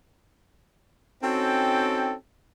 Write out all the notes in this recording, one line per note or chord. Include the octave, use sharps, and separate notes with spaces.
C4 C#4 D#4 F#4 A4 G5